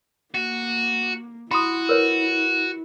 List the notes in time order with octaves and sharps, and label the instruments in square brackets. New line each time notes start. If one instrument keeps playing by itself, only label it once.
[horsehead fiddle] A#3 [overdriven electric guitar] F#4
[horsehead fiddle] E4 [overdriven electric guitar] F#4 [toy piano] B5 C6 D#6
[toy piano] A#4 B4 C#5